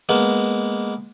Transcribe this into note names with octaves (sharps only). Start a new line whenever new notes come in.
G#3 A#3 B3